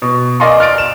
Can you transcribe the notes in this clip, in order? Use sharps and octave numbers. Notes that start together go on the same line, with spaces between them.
B2
A#4 D5 D#5 G#5 C6 C#6
F6 A6 D7
E7